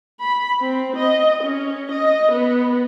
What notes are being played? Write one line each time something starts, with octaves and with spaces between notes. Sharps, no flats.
B5
C4
D#5
C#4
D#5
B3